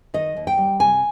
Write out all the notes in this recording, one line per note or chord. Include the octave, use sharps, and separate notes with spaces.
D#3 D#5
D#2
G5
G3
C3 G#5